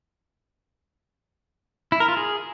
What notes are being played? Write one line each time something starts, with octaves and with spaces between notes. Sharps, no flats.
E4
A#4
F4
G#4